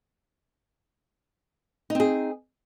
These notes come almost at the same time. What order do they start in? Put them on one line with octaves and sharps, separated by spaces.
D#4 C4 G#4